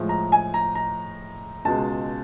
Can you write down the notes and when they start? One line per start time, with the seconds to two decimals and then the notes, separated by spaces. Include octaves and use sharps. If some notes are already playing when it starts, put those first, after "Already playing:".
Already playing: A2 F3 G#3
0.09 A#5
0.32 G#5
0.54 A#5
0.75 A#5
1.65 C#2 B2 G#3 A5